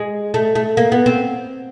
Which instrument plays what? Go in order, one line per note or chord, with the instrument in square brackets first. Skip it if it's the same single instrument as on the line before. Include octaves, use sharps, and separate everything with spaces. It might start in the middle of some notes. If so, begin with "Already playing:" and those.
Already playing: [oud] G#3
A3
A3
A#3
B3
C4